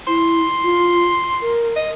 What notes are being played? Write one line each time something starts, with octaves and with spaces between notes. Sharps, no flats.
E4 C6
F4
A#4
D#5